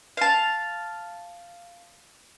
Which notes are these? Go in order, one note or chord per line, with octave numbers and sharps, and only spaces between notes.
F5 A5